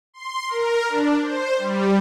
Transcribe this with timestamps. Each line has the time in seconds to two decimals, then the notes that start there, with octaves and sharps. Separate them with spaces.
0.14 C6
0.48 A#4
0.88 D4
1.21 C5
1.58 G3